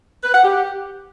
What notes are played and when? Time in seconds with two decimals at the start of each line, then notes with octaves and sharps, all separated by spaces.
0.24 B4
0.33 F#5
0.43 G4